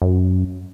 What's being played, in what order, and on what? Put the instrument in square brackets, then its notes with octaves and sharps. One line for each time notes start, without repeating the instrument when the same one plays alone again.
[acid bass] F#2